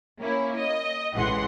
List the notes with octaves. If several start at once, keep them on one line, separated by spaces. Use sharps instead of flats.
A#3 C#4 E4
D#5
A1 E3 G#3 F#5 C6